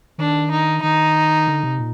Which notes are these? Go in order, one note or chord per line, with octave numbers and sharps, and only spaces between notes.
D#3 D4
D#4
D#3 D#4
D3
C3
A#2